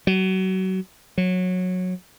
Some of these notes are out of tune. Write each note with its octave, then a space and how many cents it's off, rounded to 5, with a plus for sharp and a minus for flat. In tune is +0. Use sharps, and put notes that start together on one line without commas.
F#3 +30
F#3 -15